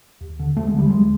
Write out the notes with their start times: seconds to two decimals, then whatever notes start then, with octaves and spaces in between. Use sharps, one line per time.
0.21 D#2
0.39 D3
0.57 D#2 A3
0.67 G#3
0.74 D3 G3
0.90 D#2 G#3